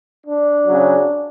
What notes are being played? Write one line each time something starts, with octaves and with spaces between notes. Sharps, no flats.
D4
C#3 F#3